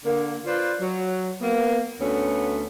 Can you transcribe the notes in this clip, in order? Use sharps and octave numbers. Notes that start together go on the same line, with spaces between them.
D3 A#3
F4 B4 C5 D5
F#3
A#3 B3
D2 A3 B3 C#4